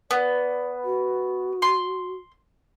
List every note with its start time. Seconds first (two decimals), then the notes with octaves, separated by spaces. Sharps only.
0.11 B3 D5
0.84 F#4
1.62 C6